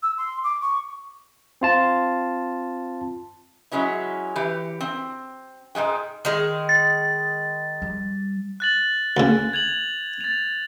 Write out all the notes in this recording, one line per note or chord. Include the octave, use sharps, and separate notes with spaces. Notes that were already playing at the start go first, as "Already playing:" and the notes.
E6
C6
D6
C#6
C4 F4 A5
F#3 G#3 C#4 E4
E3 G4
C4
G#2 F3 G#3 G5
D#3 G#3
A6
G3
F#6 A6 F#7
D2 C#3
G#6 F7 F#7
A6 F7